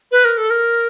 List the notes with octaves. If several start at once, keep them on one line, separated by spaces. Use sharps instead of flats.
B4
A#4
A4
A#4